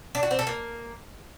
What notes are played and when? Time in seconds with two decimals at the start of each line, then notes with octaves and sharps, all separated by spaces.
0.15 D4
0.23 F#4
0.31 C4
0.39 A4
0.47 A#3